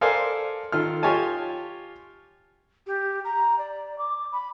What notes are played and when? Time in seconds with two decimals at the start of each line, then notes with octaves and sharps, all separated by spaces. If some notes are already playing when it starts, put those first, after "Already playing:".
0.01 A4 A#4 C5 D5 F5 G#5
0.72 D#3 F4 A4 F6
1.03 F4 G4 C#5 D#5 G#5 A5
2.86 G4
3.24 A#5
3.58 D5
3.98 D6
4.32 B5